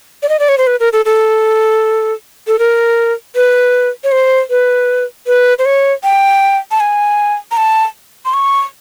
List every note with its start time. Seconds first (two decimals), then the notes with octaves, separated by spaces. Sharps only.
0.23 D5
0.29 D#5
0.39 D5
0.49 C#5
0.58 C5
0.67 B4
0.80 A#4
0.93 A4
1.05 A4
2.48 A4
2.59 A#4
3.35 B4
4.04 C#5
4.12 C5
4.50 B4
5.27 B4
5.59 C5
5.65 C#5
6.04 G5
6.71 A5
6.80 G#5
7.51 A#5
7.57 A5
8.25 C6
8.34 C#6